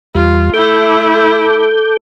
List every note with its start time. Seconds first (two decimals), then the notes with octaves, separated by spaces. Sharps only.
0.15 E2 G3 F4
0.54 A3 E4 A4 D6 G6